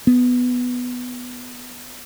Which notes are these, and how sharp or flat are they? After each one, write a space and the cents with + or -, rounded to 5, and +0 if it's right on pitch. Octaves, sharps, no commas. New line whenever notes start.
B3 +5